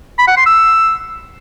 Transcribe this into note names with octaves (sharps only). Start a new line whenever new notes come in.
B5
F#5
C6
E6